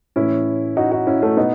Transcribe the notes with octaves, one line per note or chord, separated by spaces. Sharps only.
A2 E3 C#4 E4
D#4 F#4
D#4 F#4
C#4 E4
A3 C#4
B2 B3 D#4